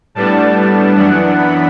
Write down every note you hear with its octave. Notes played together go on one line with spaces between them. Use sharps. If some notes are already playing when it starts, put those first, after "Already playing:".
A2 G3 B3 D4 A5
F#2 E3 B3 D4 F#5
B5